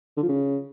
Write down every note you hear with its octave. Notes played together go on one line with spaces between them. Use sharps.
D3
F3
C#3